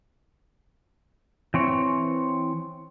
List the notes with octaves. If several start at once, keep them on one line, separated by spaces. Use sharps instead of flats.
E3 C4 C#5